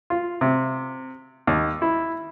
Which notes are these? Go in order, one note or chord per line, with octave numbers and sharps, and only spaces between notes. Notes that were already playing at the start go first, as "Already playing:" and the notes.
F4
C3
D#2
E4